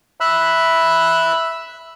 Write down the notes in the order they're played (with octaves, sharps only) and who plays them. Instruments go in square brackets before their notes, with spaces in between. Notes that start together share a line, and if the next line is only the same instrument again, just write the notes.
[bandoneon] E5 B5 E6 F#6